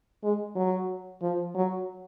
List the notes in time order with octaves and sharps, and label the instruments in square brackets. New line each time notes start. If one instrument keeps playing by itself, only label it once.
[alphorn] G#3
F#3
F3
F#3